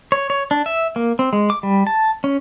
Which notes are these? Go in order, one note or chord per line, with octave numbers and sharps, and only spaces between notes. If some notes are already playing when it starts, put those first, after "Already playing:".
C#5
C#5
D4
E5
A#3
C4
G#3
D6
G3
A5
C#4